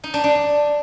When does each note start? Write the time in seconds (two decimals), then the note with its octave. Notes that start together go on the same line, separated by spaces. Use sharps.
0.04 D#4
0.14 D4
0.24 D4